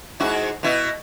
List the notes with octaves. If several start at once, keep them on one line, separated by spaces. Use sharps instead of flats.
G#2 E4 F#4
B2 E4